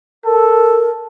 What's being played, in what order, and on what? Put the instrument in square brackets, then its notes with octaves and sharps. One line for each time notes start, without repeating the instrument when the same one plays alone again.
[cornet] A4 [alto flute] A#4